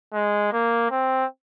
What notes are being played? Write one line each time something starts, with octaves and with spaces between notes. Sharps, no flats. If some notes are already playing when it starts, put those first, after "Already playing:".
G#3
A#3
C4